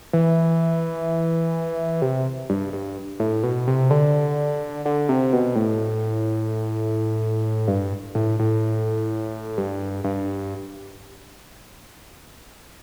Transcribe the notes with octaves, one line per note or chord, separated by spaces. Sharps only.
E3
C3
G2
G2
A2
B2
C3
D3
D3
C3
B2
A2
G2
A2
A2
G2
G2